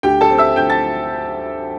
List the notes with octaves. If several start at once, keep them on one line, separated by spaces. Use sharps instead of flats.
D2 G4 G5
A4 A5
C4
E5 E6
D2 G5 G6
A5 A6